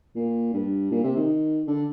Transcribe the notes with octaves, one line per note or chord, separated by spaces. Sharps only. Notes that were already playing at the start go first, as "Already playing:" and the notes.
A#2
G2
A#2
C3
D#3
D3